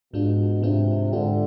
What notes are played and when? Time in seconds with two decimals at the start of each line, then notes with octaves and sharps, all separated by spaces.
0.13 G#2 B2 G#3 D4 F4
0.62 G#2 C3 G#3 D4 F4
1.13 G#2 D3 G#3 D4 F4